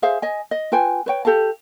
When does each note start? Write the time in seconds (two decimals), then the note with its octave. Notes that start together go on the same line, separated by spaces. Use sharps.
0.02 G#4 C5 E5 F5
0.22 D#5 G#5
0.51 D#5
0.72 F4 B4 G5 G#5
1.06 B4 C#5 G5
1.25 G4 A4 F5 A5